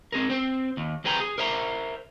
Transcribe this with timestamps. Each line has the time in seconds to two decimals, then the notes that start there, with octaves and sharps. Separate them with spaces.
0.12 C4 G#4 A#4
0.30 C4 C5
0.77 D#2
1.04 F2 C4 G#4 B4 G5 A#5
1.20 G#4
1.38 A#4 C5 E5 A#5